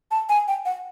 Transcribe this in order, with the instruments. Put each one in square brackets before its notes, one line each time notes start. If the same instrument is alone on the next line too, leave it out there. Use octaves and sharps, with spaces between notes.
[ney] A5
G#5
G5
F#5